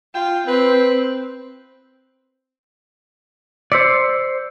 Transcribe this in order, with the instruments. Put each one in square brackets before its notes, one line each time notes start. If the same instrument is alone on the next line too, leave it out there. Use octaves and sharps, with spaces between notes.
[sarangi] F4 [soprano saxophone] G5
[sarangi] C4 [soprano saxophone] B4
[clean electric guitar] C5 D5 [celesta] E6 B6 C#7